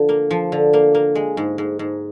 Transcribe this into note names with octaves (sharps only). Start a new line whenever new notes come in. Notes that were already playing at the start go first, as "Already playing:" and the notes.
Already playing: D3 F3
A#3
F3
D3
A#3
A#3
G#3
G#2
G#2
G#2